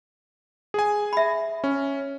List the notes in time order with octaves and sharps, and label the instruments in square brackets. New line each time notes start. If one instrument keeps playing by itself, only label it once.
[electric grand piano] G#4 G#5
[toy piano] E5 B5
[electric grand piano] C#4